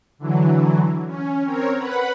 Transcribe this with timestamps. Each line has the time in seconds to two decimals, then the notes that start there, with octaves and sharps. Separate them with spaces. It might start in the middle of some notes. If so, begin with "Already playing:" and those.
0.18 D3 E3 F#3
1.06 C#4
1.43 C4 A#4 C#5
1.76 B4 F#5 B5